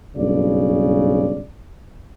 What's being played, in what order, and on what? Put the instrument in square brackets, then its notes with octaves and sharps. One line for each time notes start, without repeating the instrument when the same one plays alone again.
[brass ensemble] F#1 B1 G2 C#3 D5